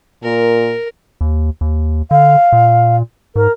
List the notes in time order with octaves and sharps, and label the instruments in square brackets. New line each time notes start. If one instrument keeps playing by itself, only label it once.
[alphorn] A#2 [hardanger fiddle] A#4
[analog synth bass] D#2
D#2
[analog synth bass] D3 [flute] F5
[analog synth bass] A#2
[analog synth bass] G#2 [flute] A#4